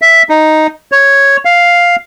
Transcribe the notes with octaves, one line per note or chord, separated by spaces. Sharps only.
E5
D#4
C#5
F5